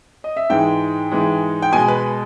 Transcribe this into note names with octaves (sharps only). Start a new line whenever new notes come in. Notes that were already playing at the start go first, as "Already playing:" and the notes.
D#5
E5
G#2 E3 G#3 G5
G#2 E3 G#3
G5
B2 G#3 G#5
B4